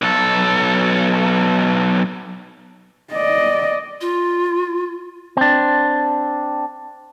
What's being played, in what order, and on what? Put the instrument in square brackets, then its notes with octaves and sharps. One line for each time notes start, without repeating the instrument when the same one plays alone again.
[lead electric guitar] B1 A4
[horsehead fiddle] D5 D#5
[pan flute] F4
[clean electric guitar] C4 D4